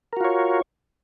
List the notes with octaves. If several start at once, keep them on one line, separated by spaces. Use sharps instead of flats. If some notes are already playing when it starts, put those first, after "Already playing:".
F4 F#4 A#4 C#5